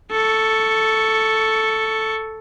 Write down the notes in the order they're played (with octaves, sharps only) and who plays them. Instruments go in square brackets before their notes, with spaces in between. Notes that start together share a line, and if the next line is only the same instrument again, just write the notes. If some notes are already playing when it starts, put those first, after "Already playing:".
[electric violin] A4 C#6